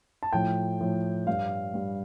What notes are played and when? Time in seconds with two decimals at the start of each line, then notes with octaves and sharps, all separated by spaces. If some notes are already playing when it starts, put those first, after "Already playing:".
0.23 A5
0.33 A2 F3 G5
0.81 A2 F3
1.27 G2 G3 F5
1.74 G2 G3